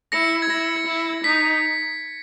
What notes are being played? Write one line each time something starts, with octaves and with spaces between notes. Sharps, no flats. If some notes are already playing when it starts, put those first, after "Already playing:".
E4 A#6 C#7
G#6
E4 A#6
E4
D#4 B6